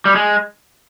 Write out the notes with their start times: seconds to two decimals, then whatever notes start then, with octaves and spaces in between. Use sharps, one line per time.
0.05 G3
0.15 G#3